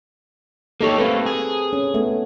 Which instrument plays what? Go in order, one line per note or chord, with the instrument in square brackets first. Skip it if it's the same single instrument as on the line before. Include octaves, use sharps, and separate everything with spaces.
[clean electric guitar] A#3 D#4 C#5 [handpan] G4 A4
[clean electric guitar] A3 A#3 [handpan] C4 B4
[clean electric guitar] G#4
[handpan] C#4
A3 B3